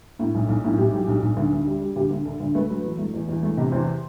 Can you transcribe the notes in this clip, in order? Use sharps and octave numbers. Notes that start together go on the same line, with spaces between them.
A2
B1
B1
A2
B1 G4
F#3
B1
B1
D2
D2
G3
G3
D2 G4
D2
D3 A4
D2
A3 B4
F#3
E2
A3
E2
E2
A3
C3
E2 C5